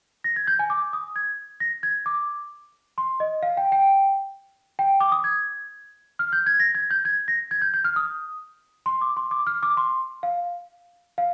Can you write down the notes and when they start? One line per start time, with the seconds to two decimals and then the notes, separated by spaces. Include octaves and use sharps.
0.24 A#6
0.36 G#6
0.47 G6
0.59 G#5
0.70 D6
0.93 D#6
1.16 G#6
1.60 A#6
1.83 G#6
2.06 D6
2.98 C6
3.20 D#5
3.43 F5
3.57 G5
3.72 G5
4.79 G5
5.00 D6
5.12 D#6
5.24 G#6
6.19 F6
6.33 G6
6.46 G#6
6.60 A#6
6.75 G#6
6.91 G6
7.05 G#6
7.28 A#6
7.51 G#6
7.62 G6
7.74 G6
7.84 F6
7.96 D#6
8.86 C6
9.01 D6
9.17 C6
9.31 D6
9.47 F6
9.63 D6
9.77 C6
10.23 F5
11.18 F5